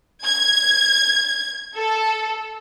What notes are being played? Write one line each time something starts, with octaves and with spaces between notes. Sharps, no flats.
G#6
A4